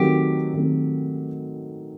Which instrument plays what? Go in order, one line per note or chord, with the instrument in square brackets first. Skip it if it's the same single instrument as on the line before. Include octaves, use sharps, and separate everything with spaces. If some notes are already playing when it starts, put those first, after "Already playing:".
Already playing: [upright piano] D#3 F#3 A3 C4 [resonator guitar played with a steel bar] G4
[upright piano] D#3 F#3 A3 C4